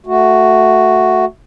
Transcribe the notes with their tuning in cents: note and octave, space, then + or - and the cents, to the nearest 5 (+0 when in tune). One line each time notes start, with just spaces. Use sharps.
A3 +0 F#4 +0